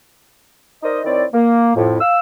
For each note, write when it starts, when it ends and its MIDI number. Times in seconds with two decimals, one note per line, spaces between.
0.83 1.00 63
0.83 1.00 70
0.83 1.00 72
0.83 1.00 74
0.83 1.00 75
1.05 1.23 51
1.05 1.23 60
1.05 1.23 64
1.05 1.23 73
1.05 1.23 74
1.33 1.75 58
1.75 1.96 41
1.75 1.96 45
2.01 2.20 77
2.01 2.20 88